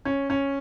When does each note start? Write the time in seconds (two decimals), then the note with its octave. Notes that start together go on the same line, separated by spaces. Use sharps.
0.05 C#4
0.30 C#4